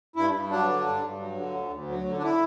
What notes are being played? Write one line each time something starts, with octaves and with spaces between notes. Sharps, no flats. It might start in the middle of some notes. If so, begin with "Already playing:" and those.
G2 E4
G2
F#3 D4
D3
G2
G2
F#3
D3
D2
D2
F#3
D3
D4
E4